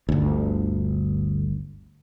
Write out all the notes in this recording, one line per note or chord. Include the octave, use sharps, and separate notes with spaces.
G1 D2